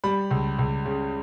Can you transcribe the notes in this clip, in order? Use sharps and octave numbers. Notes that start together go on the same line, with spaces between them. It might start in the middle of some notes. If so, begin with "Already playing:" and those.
G3 B5
C#2
C#2
C#3